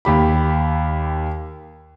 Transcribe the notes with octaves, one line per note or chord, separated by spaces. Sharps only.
D#2 G4 B5